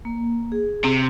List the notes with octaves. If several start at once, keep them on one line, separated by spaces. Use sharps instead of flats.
A#3
G#4
C3